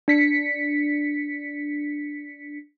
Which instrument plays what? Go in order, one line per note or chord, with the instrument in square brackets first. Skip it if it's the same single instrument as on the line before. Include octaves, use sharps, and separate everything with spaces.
[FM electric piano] D4 B6 C#7